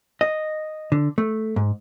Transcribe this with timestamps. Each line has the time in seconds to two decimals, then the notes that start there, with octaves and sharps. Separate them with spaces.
0.21 D#5
0.92 D3
1.18 A3
1.56 G#2